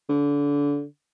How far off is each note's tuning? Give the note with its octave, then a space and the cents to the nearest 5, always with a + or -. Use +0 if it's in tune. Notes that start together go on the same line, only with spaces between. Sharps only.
D3 -30